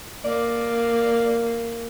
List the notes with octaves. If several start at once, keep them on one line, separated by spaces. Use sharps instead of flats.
A#3 D5